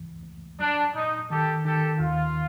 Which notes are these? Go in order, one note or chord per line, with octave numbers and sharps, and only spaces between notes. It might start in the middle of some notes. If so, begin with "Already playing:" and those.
Already playing: C#2 E3
C#2
F#3 D4
A#2 D#4
D#3 G4 A4
D#3 G4 A4
D#2 F4